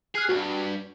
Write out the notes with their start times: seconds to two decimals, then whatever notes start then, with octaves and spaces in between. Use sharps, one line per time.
0.15 G#4 F6 F#6 C7
0.29 C#2 G2 F#4